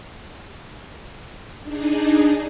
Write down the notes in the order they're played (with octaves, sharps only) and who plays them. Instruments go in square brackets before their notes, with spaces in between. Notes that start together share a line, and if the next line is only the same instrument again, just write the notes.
[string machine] D4 D#4 G#4